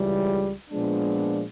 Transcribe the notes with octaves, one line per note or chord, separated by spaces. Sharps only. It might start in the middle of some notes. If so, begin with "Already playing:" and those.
Already playing: C#2 C#3 E3 G3
A#2 F3 G#3 B3 D4